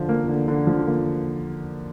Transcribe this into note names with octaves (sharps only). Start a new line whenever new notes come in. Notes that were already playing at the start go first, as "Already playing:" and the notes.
Already playing: D3 F3
A#3
D3
D3
F3
A#3